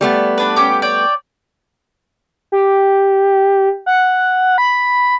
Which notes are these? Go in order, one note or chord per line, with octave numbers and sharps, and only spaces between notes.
G3 A3 B3
D4 B4
C#4 G4 D6
C#5 D5 G5
G4
F#5
B5